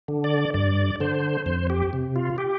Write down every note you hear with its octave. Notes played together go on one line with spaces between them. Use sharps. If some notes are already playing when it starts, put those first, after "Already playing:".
D3
D5
G2 D5
D3 C5
F2 C5
G4
C3
F4
G4